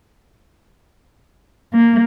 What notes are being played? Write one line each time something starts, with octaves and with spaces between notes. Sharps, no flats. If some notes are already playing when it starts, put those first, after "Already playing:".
A#3